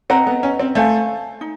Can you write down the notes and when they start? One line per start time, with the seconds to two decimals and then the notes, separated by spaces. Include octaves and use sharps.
0.10 C4 B4 D#5 F#5 A#5
0.27 B3
0.43 C#4
0.59 C4
0.75 A3 A4 C5 F5 G#5
1.41 D#4